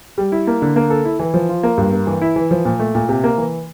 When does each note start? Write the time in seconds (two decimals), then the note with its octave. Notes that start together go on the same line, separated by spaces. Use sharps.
0.18 G3
0.32 E4
0.47 A#3
0.62 D3
0.76 A#3
0.90 A4
1.05 E4
1.19 E3
1.34 F3
1.49 F4
1.63 A#3
1.78 G2
1.93 A#3
2.07 E3
2.22 E4
2.36 E3
2.51 F3
2.65 A#2
2.80 A3
2.95 A#2
3.09 C3
3.24 A#3
3.38 E3